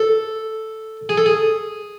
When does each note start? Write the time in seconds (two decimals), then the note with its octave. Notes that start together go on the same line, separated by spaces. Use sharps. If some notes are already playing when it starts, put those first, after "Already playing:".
Already playing: A4
1.09 G#4
1.18 A4
1.26 G#4